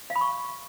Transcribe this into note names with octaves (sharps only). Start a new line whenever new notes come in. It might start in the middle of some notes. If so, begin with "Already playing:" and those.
F5
B5
C#6